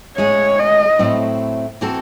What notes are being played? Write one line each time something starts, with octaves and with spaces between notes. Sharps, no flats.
A2 G#3 C#4 G#4 C#5
D#5
A2 F#3 A3 C4 E4
E3 C4 F#4 A4